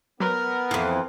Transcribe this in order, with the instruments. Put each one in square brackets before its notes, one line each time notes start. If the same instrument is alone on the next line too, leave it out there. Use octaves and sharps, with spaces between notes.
[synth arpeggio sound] F#3 B4 [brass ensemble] B3 [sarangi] A#4
[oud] F2 E3